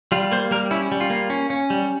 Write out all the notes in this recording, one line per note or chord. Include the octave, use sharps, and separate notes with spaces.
G3 F4
A#3 C5
G3 A#4
C#4 E4
G3
F4
A#3
C#4
C#4
G3